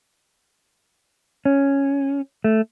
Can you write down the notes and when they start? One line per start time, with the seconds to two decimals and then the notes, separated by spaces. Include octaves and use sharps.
1.45 C#4
2.44 A3